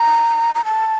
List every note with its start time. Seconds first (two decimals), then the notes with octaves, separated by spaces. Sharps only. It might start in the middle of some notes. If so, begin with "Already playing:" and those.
Already playing: A#5
0.55 A#5
0.65 A5